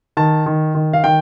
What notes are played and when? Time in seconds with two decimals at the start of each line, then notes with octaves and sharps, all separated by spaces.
0.17 D#3 A5
0.46 D#3
0.75 D#3
0.93 F5
1.04 D#3 G5